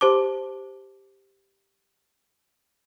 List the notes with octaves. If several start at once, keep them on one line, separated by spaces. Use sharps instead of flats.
G4 C5 A5 D6